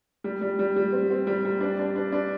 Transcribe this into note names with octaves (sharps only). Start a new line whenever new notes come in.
G3
G3
G3
G3
C4
C4
G3
G3
D4
D4
D4
D4